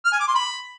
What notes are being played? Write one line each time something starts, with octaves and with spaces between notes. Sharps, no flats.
F6
G#5
D6
C6
B5